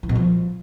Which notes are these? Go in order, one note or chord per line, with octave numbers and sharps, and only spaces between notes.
E3
B2
F3